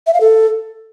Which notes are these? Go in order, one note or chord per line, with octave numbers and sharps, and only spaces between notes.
E5
F5
A4